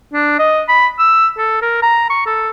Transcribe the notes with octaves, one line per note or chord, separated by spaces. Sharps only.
D4
D#5
B5
E6
A4
A#4
A#5
C#6
A4